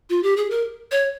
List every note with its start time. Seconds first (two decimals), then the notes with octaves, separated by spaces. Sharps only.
0.10 F4
0.23 G4
0.37 G#4
0.50 A#4
0.91 C#5